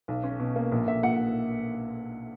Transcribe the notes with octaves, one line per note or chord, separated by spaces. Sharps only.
B1
C#4
B2
A#3
A#1
A#1 E5
A#2 F#5